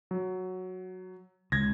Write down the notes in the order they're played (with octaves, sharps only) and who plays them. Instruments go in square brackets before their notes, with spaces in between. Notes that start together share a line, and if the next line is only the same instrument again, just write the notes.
[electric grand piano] F#3
[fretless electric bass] C#2 [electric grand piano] G#6 A#6